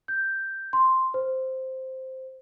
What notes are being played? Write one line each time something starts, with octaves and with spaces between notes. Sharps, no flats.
G6
C6
C5